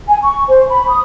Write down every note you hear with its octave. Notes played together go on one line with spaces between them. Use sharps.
G#5
C#6
C5
B5
D#6